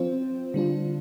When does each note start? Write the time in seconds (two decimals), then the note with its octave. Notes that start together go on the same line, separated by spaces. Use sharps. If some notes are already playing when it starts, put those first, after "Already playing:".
Already playing: F3 C4 F4 C5
0.54 D3 G3 D4 F4